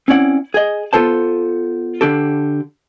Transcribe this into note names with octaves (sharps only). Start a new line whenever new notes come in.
C4 C#4 E4 D5 F#5
G#4 D#5
B3 F4 A4 C5 A5
D3 D4 G4 A4